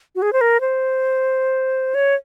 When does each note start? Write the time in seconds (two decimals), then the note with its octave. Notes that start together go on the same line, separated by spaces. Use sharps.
0.15 F#4
0.22 G#4
0.33 C5
0.41 A#4
0.61 C5
1.95 C#5